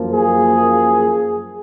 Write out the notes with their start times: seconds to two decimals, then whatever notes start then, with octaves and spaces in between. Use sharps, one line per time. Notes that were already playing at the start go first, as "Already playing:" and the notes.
Already playing: F#2 F3 A#3
0.12 G#4